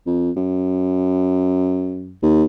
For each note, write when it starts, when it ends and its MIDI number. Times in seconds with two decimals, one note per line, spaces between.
0.06 0.31 41
0.36 2.17 42
2.22 2.44 39